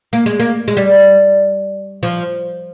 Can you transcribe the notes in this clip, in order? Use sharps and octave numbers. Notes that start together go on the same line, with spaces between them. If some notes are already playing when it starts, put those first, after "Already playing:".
A#3
G#3
A#3
G#3
G3
F3